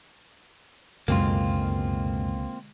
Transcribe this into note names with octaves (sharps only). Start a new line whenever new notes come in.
C#2 F#2 B2 D3 G#3 A#3 C4 F4